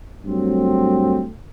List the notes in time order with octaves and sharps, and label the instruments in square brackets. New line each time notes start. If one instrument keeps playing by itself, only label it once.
[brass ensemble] G2 F#3 A3 C4